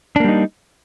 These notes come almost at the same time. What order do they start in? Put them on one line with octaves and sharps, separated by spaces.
D4 A#3 G3 D#4